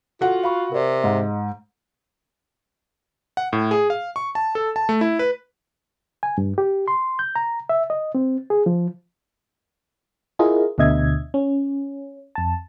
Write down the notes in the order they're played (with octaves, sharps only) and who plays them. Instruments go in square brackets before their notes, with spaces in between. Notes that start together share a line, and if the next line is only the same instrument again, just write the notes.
[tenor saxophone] F4 [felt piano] F#4 F#5 [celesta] A4
[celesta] F5 B5 C#6
[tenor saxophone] C3 [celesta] A#4 D5
[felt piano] G#2 [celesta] D#5
[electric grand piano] F#5
A2
G#4
F5
C#6
A5
A4
A5
A3
E4
B4
[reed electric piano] G#5
G2
G4
C6
G6
A#5
E5
D#5
C4
G#4
F3
[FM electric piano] E4 F4 G#4 A#4 D#5
D2 B2 D3 D#5 E5 G#6
C#4
F2 A5